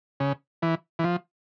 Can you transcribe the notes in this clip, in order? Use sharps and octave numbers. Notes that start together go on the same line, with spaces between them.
C#3
E3
E3
F3